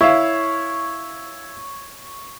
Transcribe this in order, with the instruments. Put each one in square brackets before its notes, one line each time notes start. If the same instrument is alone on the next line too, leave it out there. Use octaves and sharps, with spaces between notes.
[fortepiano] E4 E5 F5 [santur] C#5